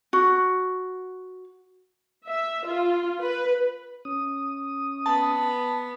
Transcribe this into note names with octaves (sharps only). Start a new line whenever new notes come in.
F#4
E5
F4
B4
C#4 D#6
B3 A5